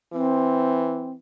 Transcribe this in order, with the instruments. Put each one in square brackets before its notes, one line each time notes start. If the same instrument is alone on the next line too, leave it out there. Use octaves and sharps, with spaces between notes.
[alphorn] E3 [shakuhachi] C4